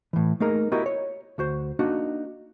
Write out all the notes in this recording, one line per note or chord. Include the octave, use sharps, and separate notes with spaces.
A2 E3
A3 A#3 D#4 G#4 A#4
B3 E4 F#4 G4 A#4 D#5
C#5
D2 F#4 C5
A#3 D4 D#4 F#4